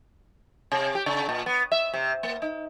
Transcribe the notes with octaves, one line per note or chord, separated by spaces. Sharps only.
C3
G4
C#3
A#2
B3
E5
C3
A#3
D#4